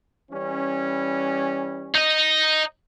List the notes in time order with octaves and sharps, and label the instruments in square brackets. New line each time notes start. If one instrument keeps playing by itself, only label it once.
[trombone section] E3 G3 C#4
[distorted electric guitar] D#4 D#5